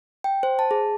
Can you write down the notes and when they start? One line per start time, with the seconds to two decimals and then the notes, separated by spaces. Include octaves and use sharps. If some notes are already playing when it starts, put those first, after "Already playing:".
0.24 G5
0.43 C5
0.59 A5
0.71 G#4